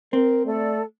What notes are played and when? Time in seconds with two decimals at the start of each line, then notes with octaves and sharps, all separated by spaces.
0.13 C4 A#4
0.46 A3 A4 D5